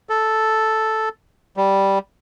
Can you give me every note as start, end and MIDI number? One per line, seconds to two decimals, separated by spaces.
0.09 1.09 69
1.57 1.99 55